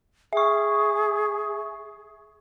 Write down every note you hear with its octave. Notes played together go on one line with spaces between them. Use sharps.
G#4 E5 C#6